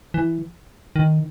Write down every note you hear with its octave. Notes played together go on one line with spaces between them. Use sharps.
E3
D#3